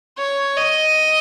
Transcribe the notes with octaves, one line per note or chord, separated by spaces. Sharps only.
C#5
D#5